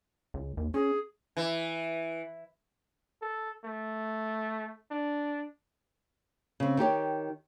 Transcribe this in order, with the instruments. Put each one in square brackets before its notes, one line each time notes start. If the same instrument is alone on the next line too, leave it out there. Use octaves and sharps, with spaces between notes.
[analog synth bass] C#2
D#2
[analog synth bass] C#4 [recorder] G#4
[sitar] E3
[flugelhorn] A4
A3
D4
[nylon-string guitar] C#3 C4
D#3 D#4 G4 C#5